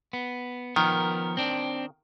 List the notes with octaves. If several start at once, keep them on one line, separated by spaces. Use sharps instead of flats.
B3
D#3 F3 B3 A#4
C4 D4